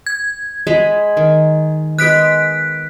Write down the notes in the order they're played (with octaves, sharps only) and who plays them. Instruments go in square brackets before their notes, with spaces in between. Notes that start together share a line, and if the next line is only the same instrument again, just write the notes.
[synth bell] G#6
[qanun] G#3 D#5 B5
D#3
[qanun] G#3 B3 [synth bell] F#6 B6 D7